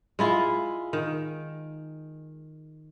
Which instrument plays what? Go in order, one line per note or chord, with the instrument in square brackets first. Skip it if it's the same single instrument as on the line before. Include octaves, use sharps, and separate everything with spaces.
[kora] G#3 E4 F4
D#3